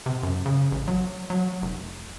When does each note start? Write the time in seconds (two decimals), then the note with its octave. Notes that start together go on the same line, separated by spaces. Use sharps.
0.06 C3
0.23 F#2
0.46 C#3
0.72 A1
0.88 F#3
1.30 F#3
1.62 F1